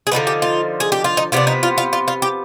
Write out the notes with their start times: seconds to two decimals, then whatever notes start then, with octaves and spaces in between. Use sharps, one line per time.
0.07 G#4
0.12 D3 F3 B3 D#4 B4
0.27 G4
0.42 F4
0.80 G#4
0.92 G4
1.04 F4
1.17 D#4
1.32 C3 F3 B3 D4 F4
1.47 D#4
1.63 F4
1.78 F4
1.93 F4
2.08 F4
2.22 G4